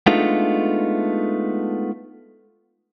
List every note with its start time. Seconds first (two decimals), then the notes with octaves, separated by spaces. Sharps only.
0.06 G#3 A3 B3 D4 D#4 F4